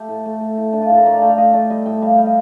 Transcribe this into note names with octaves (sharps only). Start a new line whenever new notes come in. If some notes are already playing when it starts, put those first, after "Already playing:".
Already playing: A3 G4
A2
A3
A3
A2
A2 D4
F4
A2 A4
A#4
A3 D5
F5
A3 G5
F5
A3 D#5
A3 D5
G3 D#5
A2 G5
G3 F5
G5
G3 F5
D#5